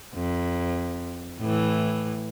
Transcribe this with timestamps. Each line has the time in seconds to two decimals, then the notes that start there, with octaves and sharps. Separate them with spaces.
0.15 F2
1.40 A2 E3